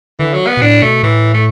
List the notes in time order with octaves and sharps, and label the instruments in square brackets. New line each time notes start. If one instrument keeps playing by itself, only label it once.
[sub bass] D3 [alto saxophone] E3
[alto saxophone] F#3
B3
[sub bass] B2
[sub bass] A2 [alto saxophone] D4
[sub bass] B2 [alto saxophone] A3
[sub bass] A2 [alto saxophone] E3
[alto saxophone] A3